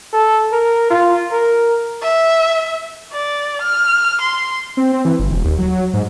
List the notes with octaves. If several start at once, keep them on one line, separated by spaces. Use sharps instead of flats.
A4
A#4
F4
A#4
E5
D5
F6
C6
C4
C4
E3
G1
E1
D#2
F#3
G#2